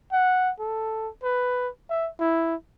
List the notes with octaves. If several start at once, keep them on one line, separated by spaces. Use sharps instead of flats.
F#5
A4
B4
E5
E4